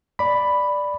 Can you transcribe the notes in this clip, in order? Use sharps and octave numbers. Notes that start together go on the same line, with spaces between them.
D5 B5